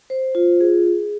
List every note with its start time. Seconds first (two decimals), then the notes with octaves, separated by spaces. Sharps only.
0.10 C5
0.35 F4
0.61 G#4
0.85 G#4